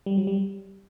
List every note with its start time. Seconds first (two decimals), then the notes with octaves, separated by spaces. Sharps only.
0.06 G3
0.18 F#3
0.27 G3